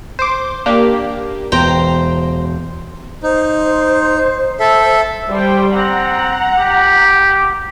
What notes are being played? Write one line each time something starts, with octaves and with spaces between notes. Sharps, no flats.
C5 D6
A#3 D4 G4
E1 C5 G5 A#5
D#4 C5
A4 E5
G3 C5 G5
C4 F#5 A#5
G4